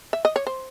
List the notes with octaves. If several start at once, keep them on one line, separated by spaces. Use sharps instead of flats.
E5
D#5
C#5
C5